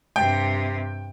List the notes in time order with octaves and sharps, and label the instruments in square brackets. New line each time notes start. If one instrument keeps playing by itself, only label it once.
[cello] G2 C3 [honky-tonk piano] G5